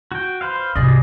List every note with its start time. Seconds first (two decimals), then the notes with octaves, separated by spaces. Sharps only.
0.12 F#4 G5
0.41 B4 C5 F5
0.76 C2 G#2 G#4 D5 D#5